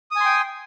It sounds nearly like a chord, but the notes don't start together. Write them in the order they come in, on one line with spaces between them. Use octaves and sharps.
D#6 G#5 C6 G5